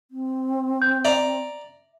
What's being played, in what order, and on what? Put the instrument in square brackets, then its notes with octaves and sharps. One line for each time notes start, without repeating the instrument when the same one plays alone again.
[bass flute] C4
[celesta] G6
[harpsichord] D5 A#5 [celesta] E5